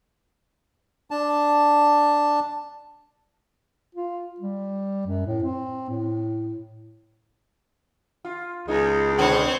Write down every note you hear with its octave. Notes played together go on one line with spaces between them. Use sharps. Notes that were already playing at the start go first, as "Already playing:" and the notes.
D4 A5
F4
G3
F#2
A2
C4
A2
F4
C#2 G#3 D#4
B2 D3 B3 C4 C#5